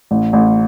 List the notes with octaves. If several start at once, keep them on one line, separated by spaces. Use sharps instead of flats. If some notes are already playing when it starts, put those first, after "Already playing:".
A1
A1